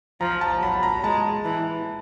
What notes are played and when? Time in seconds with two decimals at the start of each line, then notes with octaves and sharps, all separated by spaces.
0.21 F3 A#5
0.41 A5
0.61 F#3 B5
0.83 A#5
1.04 G#3 A5
1.45 E3